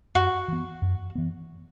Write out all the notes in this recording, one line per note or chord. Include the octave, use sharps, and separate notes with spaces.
F#2 F#4
E3 B3
F#2
E3 B3